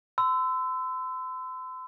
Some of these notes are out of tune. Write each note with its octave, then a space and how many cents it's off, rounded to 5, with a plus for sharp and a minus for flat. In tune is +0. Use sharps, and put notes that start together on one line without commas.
C6 -40 E6 +0